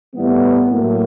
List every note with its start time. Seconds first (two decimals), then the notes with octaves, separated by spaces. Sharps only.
0.15 A2 E3 G3 B3
0.71 A2 F#3 A#3